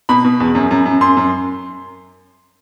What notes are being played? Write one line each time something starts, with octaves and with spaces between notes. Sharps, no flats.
B2 B5
B2
E2
F#2
F#2
F#2
F#2 C6
F#2